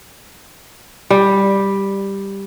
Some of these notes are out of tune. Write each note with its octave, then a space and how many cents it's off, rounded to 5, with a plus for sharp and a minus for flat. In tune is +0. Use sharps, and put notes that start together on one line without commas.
G3 +5